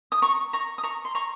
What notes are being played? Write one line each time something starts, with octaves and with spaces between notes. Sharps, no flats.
D#6
A#5 C#6
A#5 C#6
D#6
A#5 C#6
C6
A#5 C#6